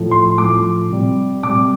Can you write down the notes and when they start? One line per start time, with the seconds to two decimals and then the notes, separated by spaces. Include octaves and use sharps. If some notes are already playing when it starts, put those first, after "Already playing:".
Already playing: A2 F3
0.11 C6
0.38 A2 F3 D6
0.90 C3 G3
1.43 C3 G3 D6